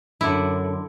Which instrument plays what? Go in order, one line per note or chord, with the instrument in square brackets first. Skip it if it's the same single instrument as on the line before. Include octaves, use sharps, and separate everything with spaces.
[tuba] F#2 [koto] D3 E4